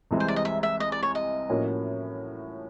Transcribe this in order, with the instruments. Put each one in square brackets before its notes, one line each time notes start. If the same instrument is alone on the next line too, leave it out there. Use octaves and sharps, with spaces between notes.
[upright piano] C2 C3 E3 G#3 C4
[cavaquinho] C5
D5
D#5
E5
E5
D#5
D5
C#5
D#5
[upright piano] A2 F3 A#3 C#4 F#4